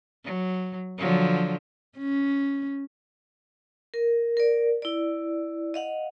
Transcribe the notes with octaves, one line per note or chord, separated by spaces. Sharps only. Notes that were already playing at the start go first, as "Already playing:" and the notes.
F#3
D3 F3 F#3
C#4
A#4
A#4 D5
E4 D5
D#5 F5 F#5